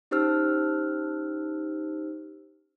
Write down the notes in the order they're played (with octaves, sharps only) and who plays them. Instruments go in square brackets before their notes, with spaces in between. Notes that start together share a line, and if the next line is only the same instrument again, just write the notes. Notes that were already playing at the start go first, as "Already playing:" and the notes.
[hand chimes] C#4 D#4 G4 C5 E6 F6